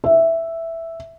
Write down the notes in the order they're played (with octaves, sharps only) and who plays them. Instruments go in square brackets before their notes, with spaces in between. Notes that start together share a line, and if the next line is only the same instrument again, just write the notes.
[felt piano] E5